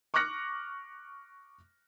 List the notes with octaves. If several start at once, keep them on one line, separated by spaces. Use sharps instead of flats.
C#6 D6 F6 F#6 A#6 C#7